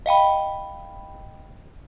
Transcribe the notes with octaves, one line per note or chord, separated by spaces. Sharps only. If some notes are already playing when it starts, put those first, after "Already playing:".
D#5 F5 G5 B5